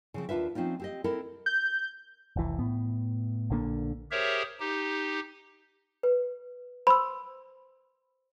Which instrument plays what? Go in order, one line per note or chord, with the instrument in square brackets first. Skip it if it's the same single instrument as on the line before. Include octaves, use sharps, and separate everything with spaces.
[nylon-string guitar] C#3 F3 C4
D#2 D4 F4 B4 E5
F3 C4 C#4 D#4 F4
C4 G4 D#5
C4 E4 A4 A#4
[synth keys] G6
[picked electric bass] F1 C2 E3
A2 B3
A#1 D3 A#3
[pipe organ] G4 G#4 A#4 C5 C#5 E5
D#4 G4
[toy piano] B4
[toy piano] C5 C6 [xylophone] B5 E6